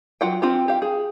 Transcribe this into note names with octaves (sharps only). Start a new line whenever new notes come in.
F#3 F4 F#5 G5
C4 F4 G4
G4 F5
G#4